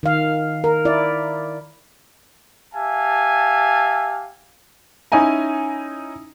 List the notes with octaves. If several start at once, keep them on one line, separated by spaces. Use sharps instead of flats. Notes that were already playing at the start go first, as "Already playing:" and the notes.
D#3 F5
A#4
E4 D5
G4 E5 F5 G#5 A5
C#4 D#4 E4 G#5 A#5